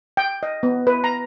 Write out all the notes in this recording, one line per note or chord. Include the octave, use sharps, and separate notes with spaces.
G5
D#5
B3
B4
A#5